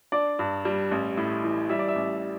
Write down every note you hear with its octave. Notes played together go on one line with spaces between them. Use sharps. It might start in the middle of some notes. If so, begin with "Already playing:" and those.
D4 D5
G2
G3
A1
A2
E3
G3 E5
D5
E5
A1